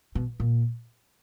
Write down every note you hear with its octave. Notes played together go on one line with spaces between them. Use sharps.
B2
A#2